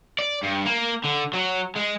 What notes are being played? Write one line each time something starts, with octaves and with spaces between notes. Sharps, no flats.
D5
G2
A#3
D3
F#3
G#3